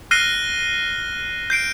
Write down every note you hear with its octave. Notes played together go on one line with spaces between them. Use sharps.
F6 F#6 A#6 C7 D#7 G7
G6 C7 D7